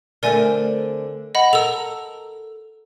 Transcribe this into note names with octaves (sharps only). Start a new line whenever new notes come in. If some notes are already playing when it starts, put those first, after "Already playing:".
D3 A3 C4 A#4 D5 G#5
D#5 F#5 B5
A4 A#4 E6 F7